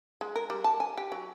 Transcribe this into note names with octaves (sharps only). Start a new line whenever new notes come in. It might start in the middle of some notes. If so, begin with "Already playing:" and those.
G#3
A#4
G3
A5
G#5
G4
F#3